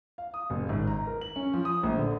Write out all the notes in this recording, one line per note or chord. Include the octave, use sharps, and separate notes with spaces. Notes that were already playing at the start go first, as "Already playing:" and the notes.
F5
D#6
F#1
G#1
A#5
A#4
F#7
C#4
F3
D#6
A#1
D3